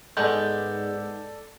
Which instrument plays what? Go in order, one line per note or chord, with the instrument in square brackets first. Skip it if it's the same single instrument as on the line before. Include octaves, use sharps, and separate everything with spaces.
[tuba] G#2 [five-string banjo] G#3 B3 B4 [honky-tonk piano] A4 D5 [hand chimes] G6